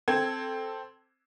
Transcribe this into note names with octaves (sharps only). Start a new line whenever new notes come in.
C4 A4 G#6